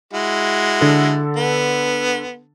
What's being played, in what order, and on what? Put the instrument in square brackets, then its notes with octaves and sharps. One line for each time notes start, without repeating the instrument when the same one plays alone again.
[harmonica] G#3 E4 F#4
[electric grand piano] D3 A4
[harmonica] B3